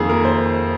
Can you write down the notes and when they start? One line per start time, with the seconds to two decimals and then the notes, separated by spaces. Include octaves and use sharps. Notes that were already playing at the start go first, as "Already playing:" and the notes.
Already playing: F2 D#3 A#3 G#4
0.09 A#4
0.25 C5